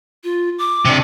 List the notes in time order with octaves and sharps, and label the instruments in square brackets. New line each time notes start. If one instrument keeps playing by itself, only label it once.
[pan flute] F4
D6
[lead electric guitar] C3 D4